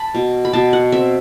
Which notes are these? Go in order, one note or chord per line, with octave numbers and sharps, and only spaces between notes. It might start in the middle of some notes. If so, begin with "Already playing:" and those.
Already playing: A5 B5
B2
B5
B2 A5
F#5
C4 E5